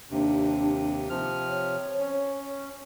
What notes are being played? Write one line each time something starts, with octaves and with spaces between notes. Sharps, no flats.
D#2 C3 D4
C3 F3 F6
C#5
C#4